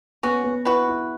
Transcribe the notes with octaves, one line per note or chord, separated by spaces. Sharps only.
B3 C#4 F#4
B3
E4 F#4 B4
E4